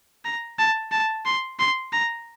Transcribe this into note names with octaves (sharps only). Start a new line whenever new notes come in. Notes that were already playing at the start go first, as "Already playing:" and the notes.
A#5
A5
A5
C6
C6
A#5